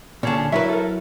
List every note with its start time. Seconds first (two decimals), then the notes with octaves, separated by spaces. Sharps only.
0.23 A#2 D3 C#4 G#4 A5
0.52 F#3 E4 A#4 B4 E5
0.69 A4 A#4